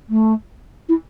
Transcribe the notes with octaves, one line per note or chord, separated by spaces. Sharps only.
A3
E4